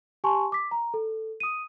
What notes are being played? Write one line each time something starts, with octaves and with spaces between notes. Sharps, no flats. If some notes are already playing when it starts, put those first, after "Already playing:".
G4 G#5 A5 C6 C#6
D6 B6
A#5
A4
D#6 D#7